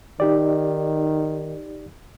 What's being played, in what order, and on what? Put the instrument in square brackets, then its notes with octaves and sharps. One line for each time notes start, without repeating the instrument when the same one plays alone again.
[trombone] D#3 [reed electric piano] D#4 G4 D5